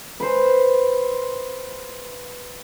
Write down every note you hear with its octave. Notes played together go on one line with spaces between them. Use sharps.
B4 C5